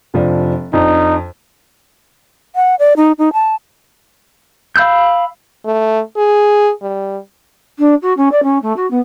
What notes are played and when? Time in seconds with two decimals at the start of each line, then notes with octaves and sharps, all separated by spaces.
0.14 F1 F3 D4
0.73 F2 D4 D#4
2.56 F#5
2.79 D5
2.97 D#4
3.19 D#4
3.33 A5
4.76 F5 B5 E6 G6
5.65 A3
6.17 G#4
6.82 G3
7.79 D4
8.02 F#4
8.17 C#4
8.32 D5
8.43 C#4
8.62 A3
8.76 F#4
8.91 B3